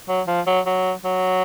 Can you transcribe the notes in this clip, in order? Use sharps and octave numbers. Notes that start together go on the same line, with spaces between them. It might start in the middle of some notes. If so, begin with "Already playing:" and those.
F#3
F3
F#3
F#3
F#3